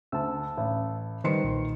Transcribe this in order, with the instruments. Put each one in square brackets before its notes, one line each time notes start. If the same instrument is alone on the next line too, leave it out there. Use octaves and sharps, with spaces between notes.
[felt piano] D2 [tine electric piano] A5 E6
[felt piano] A1
[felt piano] D#3 C6 C#7 [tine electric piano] G3 B4 C5
[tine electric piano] B1 A#2